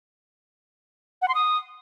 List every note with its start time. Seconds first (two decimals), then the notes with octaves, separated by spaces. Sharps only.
1.22 F#5
1.28 C6
1.35 D#6